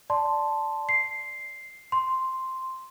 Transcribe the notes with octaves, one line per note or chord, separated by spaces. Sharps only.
D5 A5 C6
C7
C6